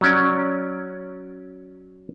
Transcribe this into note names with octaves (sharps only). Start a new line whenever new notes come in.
F#3 C#4 D5